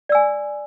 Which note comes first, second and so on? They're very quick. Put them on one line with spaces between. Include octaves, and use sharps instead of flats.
D5 E6 G#5